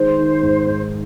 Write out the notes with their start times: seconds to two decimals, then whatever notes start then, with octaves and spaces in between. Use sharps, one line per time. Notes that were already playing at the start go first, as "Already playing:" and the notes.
Already playing: D#3 G#3 C5
0.18 D#3
0.42 G#2
0.66 G#2